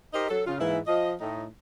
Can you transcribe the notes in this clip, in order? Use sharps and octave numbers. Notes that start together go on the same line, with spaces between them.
D#4 G4 A#4 C5 D#5
F#3 A4
C#3 F4
G#2 E3 A#3 E4
F3 D#5
A2 D#4